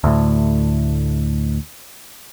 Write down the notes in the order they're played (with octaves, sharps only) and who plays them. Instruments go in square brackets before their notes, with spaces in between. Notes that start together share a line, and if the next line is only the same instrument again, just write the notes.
[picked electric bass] D2 A2